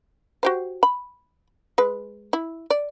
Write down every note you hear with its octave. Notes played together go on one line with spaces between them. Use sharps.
F#4 G4 C5
B5
G#3 B4
E4
D5